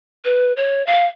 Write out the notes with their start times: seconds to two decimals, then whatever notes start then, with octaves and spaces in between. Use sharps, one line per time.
0.25 B4
0.57 C#5
0.87 F5